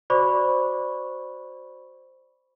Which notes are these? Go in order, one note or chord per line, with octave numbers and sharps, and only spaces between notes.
F#4 C5 D5 B5 C#6 D6